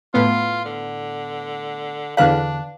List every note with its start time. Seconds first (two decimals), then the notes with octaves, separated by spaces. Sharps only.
0.14 A2 B3 F4
0.65 D3
2.17 E2 D3 D4 B4 F5 F#6